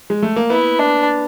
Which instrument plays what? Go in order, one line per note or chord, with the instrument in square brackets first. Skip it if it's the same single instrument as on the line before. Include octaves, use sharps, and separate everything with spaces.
[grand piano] G#3
A3
A#3
[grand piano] B3 [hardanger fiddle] E4
[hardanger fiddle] D4